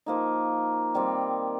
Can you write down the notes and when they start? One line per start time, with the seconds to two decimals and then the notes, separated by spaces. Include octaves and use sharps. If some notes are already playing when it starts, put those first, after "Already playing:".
0.06 F3 A#3 D#4
0.94 D#3 G3 C4